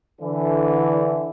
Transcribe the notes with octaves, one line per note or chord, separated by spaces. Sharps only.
D3 E3